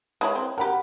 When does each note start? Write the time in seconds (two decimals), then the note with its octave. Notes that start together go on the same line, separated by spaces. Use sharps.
0.21 G#3 E4 C#5
0.35 C4
0.58 G4 A#4 F#5 B5